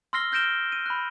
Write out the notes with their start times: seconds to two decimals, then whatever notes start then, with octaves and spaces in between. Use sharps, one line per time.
0.13 C6 E6 F6 A#6 C7 G7
0.32 F6 G6 A#6 D7 E7 G7
0.72 D#7
0.86 B5 F#6